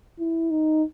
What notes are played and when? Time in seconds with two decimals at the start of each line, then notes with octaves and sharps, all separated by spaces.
0.19 E4
0.51 D#4